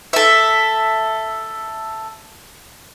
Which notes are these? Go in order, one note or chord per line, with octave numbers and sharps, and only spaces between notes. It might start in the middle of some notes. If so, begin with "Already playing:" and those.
A4 E5